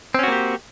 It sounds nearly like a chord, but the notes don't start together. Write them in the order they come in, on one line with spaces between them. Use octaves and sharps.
C4 C#4 F#4 A#3 G4